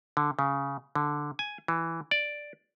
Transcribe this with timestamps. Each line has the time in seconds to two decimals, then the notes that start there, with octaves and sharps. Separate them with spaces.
0.17 D3
0.39 C#3
0.95 D3
1.39 G#5
1.68 E3
2.11 D5